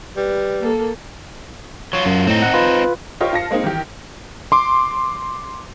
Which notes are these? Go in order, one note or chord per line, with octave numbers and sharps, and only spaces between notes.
G3 B4
A#3 A4
F#3 F4 C#5
F#2
A2 C4 D#4
F#5
F4 B4
F4 G4 A#4 C5 C#5 D#5
F4 A5 A#6 C#7
G#3 A#3 C4 D#4
D#3 E3 G4
C6 D6